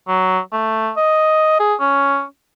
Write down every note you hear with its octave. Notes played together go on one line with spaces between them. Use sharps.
F#3
A3
D#5
G#4
C#4